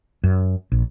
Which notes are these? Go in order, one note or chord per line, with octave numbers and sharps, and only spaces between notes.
F#2
A#1